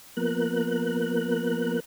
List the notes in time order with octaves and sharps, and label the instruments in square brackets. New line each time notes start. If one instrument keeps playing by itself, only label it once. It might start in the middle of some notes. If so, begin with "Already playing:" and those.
[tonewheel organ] F3 A#3 B3 A#4 F#6